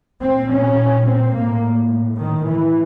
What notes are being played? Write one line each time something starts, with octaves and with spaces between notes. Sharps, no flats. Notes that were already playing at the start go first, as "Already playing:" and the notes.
A#2 C4
C#4
C4
A2 A#3
D#3
A2 E3